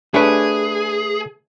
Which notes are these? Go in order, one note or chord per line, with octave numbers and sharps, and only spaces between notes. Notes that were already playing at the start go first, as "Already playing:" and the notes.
A3 D4 G4 G#4 B4 C#5